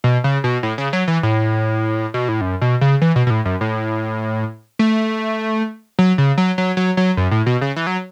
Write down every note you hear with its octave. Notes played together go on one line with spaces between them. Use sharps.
B2
C#3
B2
A2
C#3
F#3
E3
A2
B2
A2
F#2
B2
C#3
E3
B2
B2
A2
F#2
A2
A3
F#3
C#3
F#3
F#3
F#3
F#3
F#2
A2
B2
C#3
E3
F#3